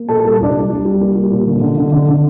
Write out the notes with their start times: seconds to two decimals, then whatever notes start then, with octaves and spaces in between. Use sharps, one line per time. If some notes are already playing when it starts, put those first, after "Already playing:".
Already playing: A#3
0.09 A#2 A4 A5
0.20 A4 A5
0.25 G3
0.39 C2 D4 D5
0.54 G3
0.70 G3
0.85 G3
1.01 A#3
1.15 G3
1.32 A#2
1.46 D3
1.61 D3
1.77 D3
1.92 D3
2.08 D3